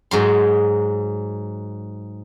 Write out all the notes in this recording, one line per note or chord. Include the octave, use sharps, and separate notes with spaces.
G#2 F#3 C6